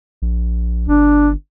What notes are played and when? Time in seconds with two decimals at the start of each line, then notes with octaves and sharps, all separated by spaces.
0.22 A#1
0.88 G1 D4